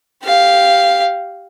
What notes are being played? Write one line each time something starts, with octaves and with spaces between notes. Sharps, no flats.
G4 F5